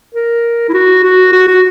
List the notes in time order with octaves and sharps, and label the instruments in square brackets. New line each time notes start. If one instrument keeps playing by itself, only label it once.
[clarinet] A#4
E4
F#4
F#4
F#4
F#4